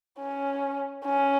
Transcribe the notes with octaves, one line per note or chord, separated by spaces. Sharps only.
C#4
C#4